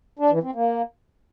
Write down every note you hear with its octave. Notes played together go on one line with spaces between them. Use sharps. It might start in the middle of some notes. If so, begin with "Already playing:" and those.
D4
E3
C4
A#3